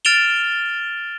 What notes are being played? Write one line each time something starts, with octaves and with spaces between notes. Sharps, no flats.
F6 A6 D7 E7 F7 G7